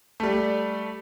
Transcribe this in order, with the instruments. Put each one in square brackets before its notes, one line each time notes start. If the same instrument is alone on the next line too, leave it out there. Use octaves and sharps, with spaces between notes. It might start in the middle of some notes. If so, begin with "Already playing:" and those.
[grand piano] G3 A3